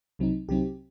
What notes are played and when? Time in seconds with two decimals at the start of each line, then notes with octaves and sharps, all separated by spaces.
0.19 C2 C3 F#3 C4 D#4
0.48 C2 C3 F#3 C4 D#4 G4